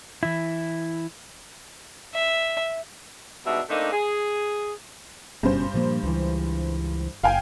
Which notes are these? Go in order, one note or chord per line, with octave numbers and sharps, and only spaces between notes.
E3 E4
E5
G#2 B2 G3 B3 D4 E5
A3 A#3 C4 D4 D#4
G#4
F#1 G2 B2 C#4 C5
A#2 F3 A#3
C#2 E3
F#1 F5 G5 G#5